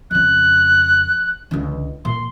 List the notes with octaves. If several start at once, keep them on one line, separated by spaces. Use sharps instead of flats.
F2 C#3 F#6
C#2 D3
A#2 C6